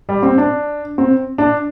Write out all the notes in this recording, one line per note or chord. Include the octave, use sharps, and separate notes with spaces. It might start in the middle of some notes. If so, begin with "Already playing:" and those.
G3
C4
D4
C4
D4